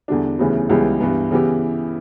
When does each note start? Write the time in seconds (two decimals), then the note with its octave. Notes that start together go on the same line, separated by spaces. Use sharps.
0.08 E2 D3 G3 D4
0.39 D2 C#3 E3 G3 B3
0.69 C#2 C#3 E3 G3 B3
1.00 G2 E3 B3
1.31 C#3 E3 B3 E4 G4